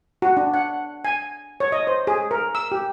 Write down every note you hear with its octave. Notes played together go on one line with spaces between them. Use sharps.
F#4
D4
F#5
G#5
C#5
D#5
C5
G#4
A#4
E6
G4